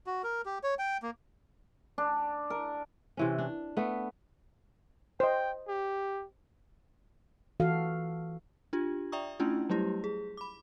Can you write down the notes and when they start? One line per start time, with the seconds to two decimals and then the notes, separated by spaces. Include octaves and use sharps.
0.07 F#4
0.24 A#4
0.46 G4
0.64 C#5
0.79 G5
1.02 A#3
1.98 D4
2.50 A#4
3.17 C3 E3 C#4
3.38 D4
3.77 A3 B3
5.20 C5 D#5 G5
5.68 G4
7.60 E3 F#4 A4 F5
8.73 D4 F4 G4
9.12 D5 E5 G5 A#5 C#6 D#6
9.40 A3 C#4 D4 E4 F4
9.69 F#3 G3 A3 E4 G4
10.04 G#4
10.37 B5 D6